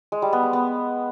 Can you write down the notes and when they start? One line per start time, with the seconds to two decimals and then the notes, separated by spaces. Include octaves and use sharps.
0.12 G#3
0.22 G3
0.33 B3
0.43 G#3
0.53 B3